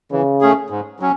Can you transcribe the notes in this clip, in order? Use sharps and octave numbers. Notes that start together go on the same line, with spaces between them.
C#3 E3
A3 C#4 G#4
G#2
F#3 C#4